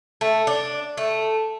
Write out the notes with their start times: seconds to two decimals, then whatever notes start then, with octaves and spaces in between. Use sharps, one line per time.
0.21 A3
0.47 D4
0.97 A3